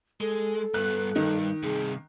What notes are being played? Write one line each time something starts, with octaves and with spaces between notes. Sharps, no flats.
G#3 A4
G2 B3 F#6
G2 D#3
G2 C3 G#4